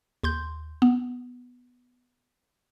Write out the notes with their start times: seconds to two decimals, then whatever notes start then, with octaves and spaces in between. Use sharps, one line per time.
0.24 D#2 C6 G6
0.82 B3